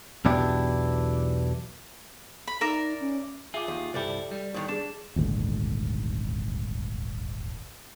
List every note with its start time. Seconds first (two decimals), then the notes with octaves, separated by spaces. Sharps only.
0.25 B1 E2 B2 D4 E4 G4
2.47 B5
2.61 D#4 A#4 D5 E5
3.01 C#4
3.54 F4 G#4 E5 D6
3.68 D#2
3.94 C2 G2 E4 G4 A4 D5
4.31 G3
4.54 D#2 A2 D#3
4.69 D4 G#4 E7
5.16 D#1 G#1 D2